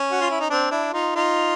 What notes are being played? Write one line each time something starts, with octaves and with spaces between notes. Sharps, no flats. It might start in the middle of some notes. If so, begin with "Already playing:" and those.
Already playing: C#4
F#4
F4
E4
D#4
C4 D4
D4 E4
D#4 F4
D#4 F4